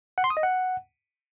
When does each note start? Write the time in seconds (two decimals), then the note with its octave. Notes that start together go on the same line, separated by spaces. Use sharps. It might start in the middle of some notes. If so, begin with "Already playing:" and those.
0.18 F#5
0.24 C6
0.30 D#6
0.37 D#5
0.43 F#5